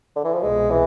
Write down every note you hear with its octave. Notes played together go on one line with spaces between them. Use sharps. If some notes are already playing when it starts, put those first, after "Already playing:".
D3
E3
F3
C2 B2 G#3 B3
E3